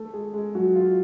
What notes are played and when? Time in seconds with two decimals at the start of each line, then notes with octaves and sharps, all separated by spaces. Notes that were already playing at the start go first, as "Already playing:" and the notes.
Already playing: A3 A4
0.14 G#3 G#4
0.33 G#3 G#4
0.55 F#3 F#4
0.75 F4